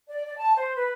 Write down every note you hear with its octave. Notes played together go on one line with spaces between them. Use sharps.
D5
D5
A5
C5
B4